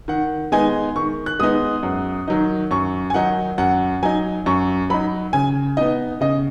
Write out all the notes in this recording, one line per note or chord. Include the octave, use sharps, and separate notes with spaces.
D#3 F#5
G#3 B3 D#4 G#5
D#3 C#6
F#6
G#3 B3 D#4 D#6
F#2
D#3 F#3 D#4
F#2 C#6
G#5
D#3 F#3 D#4 F#5
F#2 F#5
F#3 D#4 G#5
F#2 C#6
F#3 D#4 B5
C#3 G#5
B3 D#4 D#5
C#3 D#5